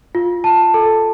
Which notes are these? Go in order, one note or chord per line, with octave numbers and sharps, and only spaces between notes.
F4
A5
A4